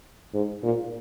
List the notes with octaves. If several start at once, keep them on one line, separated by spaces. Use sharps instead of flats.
G#2
A#2